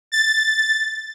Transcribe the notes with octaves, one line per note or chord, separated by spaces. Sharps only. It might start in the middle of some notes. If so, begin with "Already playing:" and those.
A6